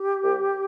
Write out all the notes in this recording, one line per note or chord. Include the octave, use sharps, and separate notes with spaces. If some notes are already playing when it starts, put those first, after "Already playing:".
Already playing: G4
C2